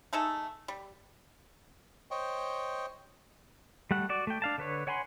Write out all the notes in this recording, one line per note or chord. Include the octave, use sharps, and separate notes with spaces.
A3 D#4 G#4 A4
G3
C5 C#5 D#5 G5
G3 A3 F#5
F#4 D5
A3 G5
D4 F5 A5
D3 B4 C#5
C#5 F#5 G#5 B5 C6